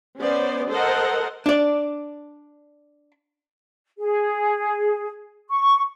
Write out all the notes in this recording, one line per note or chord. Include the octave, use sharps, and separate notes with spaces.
B3 C#4 C5 D5
A4 A#4 C5 D#5 F#5
D4 D5
G#4
C#6